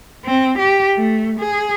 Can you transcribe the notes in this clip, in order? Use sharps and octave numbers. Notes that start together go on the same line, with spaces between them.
C4
G4
A3
G#4